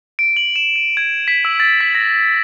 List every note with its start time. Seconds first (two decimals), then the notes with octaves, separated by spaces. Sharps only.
0.19 D7
0.37 F#7
0.56 E7
0.76 D#7
0.97 G#6
1.28 B6
1.45 E6
1.60 A6
1.81 B6
1.95 A#6